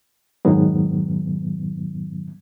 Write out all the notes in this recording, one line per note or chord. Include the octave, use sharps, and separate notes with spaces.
F2 G#2 B2 D#3 F#3 B3